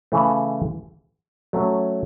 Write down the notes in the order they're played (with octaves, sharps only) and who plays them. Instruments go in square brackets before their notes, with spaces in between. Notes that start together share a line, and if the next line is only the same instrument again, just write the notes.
[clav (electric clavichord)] C#3 E3 A3
F#3 A3 C#4